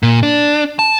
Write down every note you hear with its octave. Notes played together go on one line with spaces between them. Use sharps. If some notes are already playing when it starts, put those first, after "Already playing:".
A#2
D4
A5